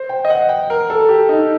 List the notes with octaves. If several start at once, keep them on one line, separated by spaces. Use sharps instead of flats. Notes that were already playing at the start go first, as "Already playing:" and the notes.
Already playing: C5
G5
D#5
F#5
G5
A#4
A4
G4
D#4